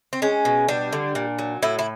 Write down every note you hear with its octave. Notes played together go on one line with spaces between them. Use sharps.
C4
G#3 C#4
B2
G3 D4
D3
A#2
F#3
A2 E4
E4